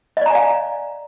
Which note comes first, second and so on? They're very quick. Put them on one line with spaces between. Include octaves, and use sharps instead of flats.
D#5 D5 A#5 G#5 F5